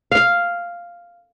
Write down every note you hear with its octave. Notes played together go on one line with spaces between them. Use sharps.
F5